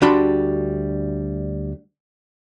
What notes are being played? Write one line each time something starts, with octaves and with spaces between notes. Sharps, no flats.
D2 G3 D4 F#4 B5 C6